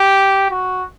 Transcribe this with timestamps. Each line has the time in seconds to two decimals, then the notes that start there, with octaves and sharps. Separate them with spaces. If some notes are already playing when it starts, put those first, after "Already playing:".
Already playing: G4
0.51 F#4